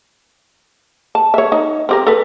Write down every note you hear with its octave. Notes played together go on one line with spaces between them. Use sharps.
A5
C#5 E5
D#4
C4 G4 A#4
A4 B4